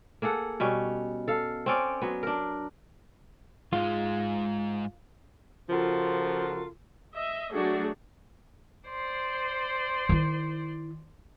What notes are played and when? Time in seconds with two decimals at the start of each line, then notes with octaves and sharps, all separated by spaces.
0.22 A#3 G#4 A4 F#5
0.60 B2 G3 C#4
1.28 A4 F5
1.66 C4 C#4 D5
2.02 F#3 B3
2.23 D4 A#4
3.73 G#2 G#3 F4
5.70 C#3 F3 F4 F#4 A4 A#4
7.14 D#5 E5
7.53 F#3 A3 D4 F#4 G#4 A4
8.89 C5 D5 C6
10.09 D#3 E4